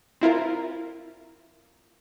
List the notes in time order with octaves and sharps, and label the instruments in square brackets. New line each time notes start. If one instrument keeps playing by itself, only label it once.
[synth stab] C4 E4 F4 A#4